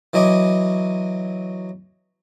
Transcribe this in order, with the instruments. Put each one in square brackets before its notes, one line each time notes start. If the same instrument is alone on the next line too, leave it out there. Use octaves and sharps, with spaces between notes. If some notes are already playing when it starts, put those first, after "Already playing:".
[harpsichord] E3 F#3 D#5 G#5 D6